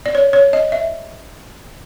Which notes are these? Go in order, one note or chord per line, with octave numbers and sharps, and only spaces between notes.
D5
C#5
C#5
D#5
E5